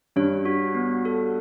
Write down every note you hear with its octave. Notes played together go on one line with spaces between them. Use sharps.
G2 C#5
F#4
B3
A4